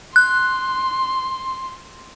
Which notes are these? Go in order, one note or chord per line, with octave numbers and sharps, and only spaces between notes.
C6 F#6